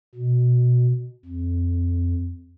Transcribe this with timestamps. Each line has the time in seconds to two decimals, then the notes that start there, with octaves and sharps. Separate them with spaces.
0.15 B2
1.25 F2